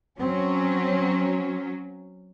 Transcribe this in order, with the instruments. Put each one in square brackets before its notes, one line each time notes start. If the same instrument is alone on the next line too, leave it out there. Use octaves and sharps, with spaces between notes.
[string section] F#3 C#4 [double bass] C4